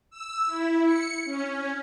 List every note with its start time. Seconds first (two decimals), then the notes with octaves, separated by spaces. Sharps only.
0.10 E6
0.46 E4
0.86 C#7
1.25 C#4